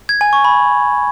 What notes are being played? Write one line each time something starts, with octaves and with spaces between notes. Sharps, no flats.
G#6
G#5
C#6
B5